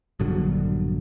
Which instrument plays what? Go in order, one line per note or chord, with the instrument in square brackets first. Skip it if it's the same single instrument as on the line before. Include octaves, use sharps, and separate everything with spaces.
[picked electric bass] A#1 G2 D3 F#3